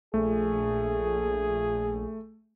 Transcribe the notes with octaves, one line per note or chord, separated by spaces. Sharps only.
A#1 A3 G#4